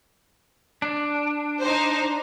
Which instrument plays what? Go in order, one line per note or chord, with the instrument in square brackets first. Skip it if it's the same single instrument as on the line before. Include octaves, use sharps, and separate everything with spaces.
[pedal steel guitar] D4
[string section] D#4 C5